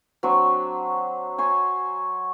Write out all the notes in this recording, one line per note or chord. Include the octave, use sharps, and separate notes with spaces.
F#3 C4 D4 C#6
C5 C#5 G#5